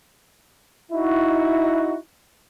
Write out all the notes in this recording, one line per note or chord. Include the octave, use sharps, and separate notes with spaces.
D#4 E4 F#4